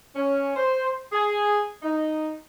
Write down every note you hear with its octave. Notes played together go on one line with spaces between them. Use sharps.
C#4
C5
G#4
D#4